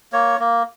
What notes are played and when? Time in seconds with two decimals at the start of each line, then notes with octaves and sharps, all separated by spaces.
0.13 A#3 C#5
0.40 A#3